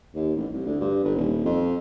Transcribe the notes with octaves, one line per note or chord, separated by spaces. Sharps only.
D#2
A1
C2
D2
G2
G1
D#1
F2